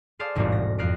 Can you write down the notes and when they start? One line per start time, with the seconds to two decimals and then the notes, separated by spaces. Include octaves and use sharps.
0.19 G#4 C5 D5 F5 A5
0.35 E1 A1 G#2 G3 C4 F#4
0.52 A#6
0.78 F2 F5 F#6 A#6 D7